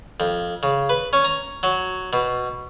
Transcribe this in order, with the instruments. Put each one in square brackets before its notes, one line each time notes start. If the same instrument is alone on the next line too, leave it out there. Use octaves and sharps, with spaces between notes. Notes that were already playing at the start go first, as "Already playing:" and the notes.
[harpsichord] F2
C#3
B4
C#4
A#5
F#3
B2